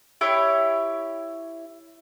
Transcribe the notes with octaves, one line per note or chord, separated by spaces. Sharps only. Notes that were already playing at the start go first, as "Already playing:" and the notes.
E4 G4 C#5